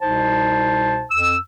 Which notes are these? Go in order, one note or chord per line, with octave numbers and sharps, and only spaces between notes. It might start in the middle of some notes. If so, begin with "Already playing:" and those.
C2 B2 D#4 C5 A5
F2 E6